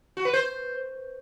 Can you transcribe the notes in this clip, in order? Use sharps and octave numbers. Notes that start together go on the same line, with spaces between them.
F#4
B4
C5